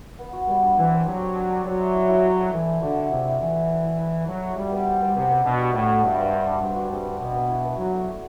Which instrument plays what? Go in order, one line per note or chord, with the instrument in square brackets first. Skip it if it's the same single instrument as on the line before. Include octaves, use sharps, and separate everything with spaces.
[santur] B3
F#4
[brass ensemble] G3 [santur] B3
[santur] D4
[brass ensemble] E3 [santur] C4
[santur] C4
[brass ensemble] F#3 [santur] G4
[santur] C4
D4
D4
[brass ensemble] F#3 [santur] C5
[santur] E5
E4
E4
E4
A4
[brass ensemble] E3 [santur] A3
[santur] C5
[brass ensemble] D3 [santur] F#4
[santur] D4
[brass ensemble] C3 [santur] E4
[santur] E4
[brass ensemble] E3 [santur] E5
[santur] E5
E4
E4
E4
E5
[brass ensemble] F#3 [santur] A4
[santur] A4
[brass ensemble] G3 [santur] F#4
[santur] B3
C5
B3
[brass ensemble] C3 [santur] B3
[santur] B3
[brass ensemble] B2 [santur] D4
[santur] G3
[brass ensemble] A2 [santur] F#4
[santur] F#4
[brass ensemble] G2 [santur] E5
[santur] C5
D4
D4
[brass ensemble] G2 [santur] C4
[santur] F#4
[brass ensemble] G2 [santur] C4
[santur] C4
[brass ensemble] B2 [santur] B3
[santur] B4
E4
B3
[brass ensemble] F#3 [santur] E4
[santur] A3
A3